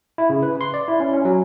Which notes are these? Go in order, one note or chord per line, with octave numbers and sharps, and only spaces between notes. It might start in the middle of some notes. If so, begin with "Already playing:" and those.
E4
C#3
B4
C6
D5
E4
C#4
C#4
F#3